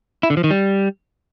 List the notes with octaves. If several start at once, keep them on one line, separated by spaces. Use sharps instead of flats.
E4
D3
F3
D#3
G3